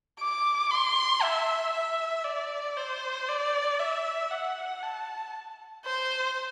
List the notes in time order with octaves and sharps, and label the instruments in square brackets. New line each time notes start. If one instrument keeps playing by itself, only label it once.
[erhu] D6
C6
E5
E5
D5
C5
D5
E5
F#5
A5
C5